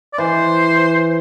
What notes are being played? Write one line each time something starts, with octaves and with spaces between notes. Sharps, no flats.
D5
E3 C5